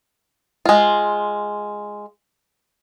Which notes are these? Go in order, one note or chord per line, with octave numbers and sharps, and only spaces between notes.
G#3 F4